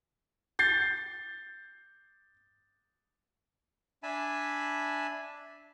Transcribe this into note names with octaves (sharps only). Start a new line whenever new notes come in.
G6 A6 C7
D4 E5 G#5 A5 B5